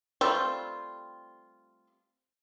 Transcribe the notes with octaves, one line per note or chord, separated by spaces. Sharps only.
G3 A3 C4 F4